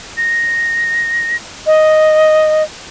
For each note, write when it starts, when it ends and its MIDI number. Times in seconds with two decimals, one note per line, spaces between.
0.17 1.36 94
1.66 2.63 75